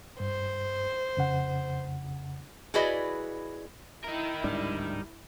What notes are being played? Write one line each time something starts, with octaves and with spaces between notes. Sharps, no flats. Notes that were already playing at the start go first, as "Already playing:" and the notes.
G2 C5
F2 C#3 F#5
E4 F#4 G#4 B4 D5 D#5
D#4 E4 A#4
D1 G#2 G3 D4